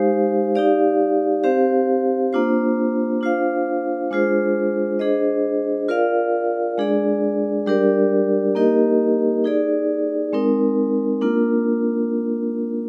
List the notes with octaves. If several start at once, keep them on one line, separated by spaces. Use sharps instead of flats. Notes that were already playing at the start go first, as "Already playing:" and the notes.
Already playing: G#3 D#4 G4 C5 F5
D#4 G4 D5 F5
C4 G4 C5 F5
A#3 D4 F4 C5
D4 F4 C5 F5
G#3 D4 F4 G#4 C5
D4 G#4 C5 D#5
F4 A#4 D5 F5
G#3 D4 G#4 D5
G3 D4 G4 A#4 D5
A#3 D#4 G4 A#4 D#5
D#4 G#4 D5
G#3 C4 D#4 A#4
A#3 D4 F4 A#4